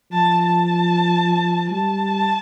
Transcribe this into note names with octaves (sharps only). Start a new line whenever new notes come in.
F3 A5
A5
G3 A5